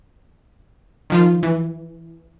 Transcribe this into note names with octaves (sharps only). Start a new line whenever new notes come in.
D#3 F3 F4
E3